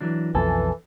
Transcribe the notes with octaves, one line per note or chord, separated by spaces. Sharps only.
E3 F#3 D4
B1 F2 E3 A4 B4 G#5 A5